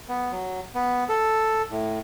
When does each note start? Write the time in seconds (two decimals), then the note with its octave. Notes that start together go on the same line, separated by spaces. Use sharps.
0.09 B3
0.32 F#3
0.75 B3
1.09 A4
1.71 A2